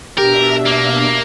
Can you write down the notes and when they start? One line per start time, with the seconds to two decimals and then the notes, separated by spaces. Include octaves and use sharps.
0.17 B2 D4 G4 A#4 E5
0.66 A#3